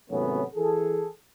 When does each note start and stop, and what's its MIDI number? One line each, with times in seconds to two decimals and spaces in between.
0.10 0.43 32
0.10 0.43 48
0.10 0.43 54
0.10 0.43 57
0.10 0.43 59
0.10 0.43 61
0.56 1.08 52
0.56 1.08 68
0.56 1.08 69